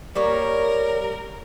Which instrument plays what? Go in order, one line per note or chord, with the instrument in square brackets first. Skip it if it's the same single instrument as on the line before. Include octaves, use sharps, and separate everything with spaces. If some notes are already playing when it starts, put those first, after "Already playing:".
[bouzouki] G3 A#3 C#5 [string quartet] A#4